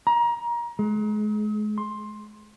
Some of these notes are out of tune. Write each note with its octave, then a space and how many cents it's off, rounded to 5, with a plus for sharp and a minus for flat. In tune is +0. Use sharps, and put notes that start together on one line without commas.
A#5 +25
G#3 +35
C6 +10